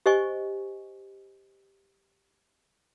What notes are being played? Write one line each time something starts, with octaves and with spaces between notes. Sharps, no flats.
G4 C5 D#5 G#5 C#6